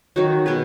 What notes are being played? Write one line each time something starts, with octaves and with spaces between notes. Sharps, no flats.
D#3 F#3 D#4 F#4
B2 B3 G#4 B4